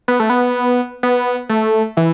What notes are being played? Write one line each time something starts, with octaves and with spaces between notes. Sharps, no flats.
B3
A3
B3
B3
A3
E3